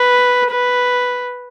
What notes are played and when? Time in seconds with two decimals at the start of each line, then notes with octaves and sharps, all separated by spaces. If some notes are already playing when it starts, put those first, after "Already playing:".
Already playing: B4
0.51 B4